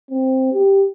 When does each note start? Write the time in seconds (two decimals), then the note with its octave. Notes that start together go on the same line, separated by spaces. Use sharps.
0.10 C4
0.52 G4